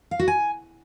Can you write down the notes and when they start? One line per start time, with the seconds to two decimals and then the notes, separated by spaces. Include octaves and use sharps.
0.11 F5
0.19 F#4
0.28 G#5